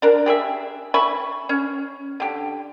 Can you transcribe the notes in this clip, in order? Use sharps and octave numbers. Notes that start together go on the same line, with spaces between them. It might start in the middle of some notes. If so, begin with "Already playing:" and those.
D4 A#4
G4 G#4 C5 E5
E5 G#5 B5 C#6
C#4
D3 G4